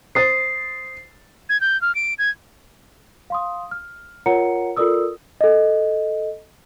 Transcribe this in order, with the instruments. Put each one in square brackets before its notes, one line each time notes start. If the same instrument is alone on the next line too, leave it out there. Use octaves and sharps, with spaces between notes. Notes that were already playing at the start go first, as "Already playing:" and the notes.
[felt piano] C5 D#6 A6 [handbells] C7
[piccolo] G#6
G6
F6
D7
G#6
[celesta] F5 C6 D#6
F6
F4 A#4 C#5 F#5 A#5 C#7
F4 A4 A#4 D5 D#6 E6
A4 D#5